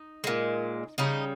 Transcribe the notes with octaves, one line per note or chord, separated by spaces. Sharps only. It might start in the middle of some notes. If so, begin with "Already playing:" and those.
Already playing: D#4
A#2 G#3
C#3 G3 D#4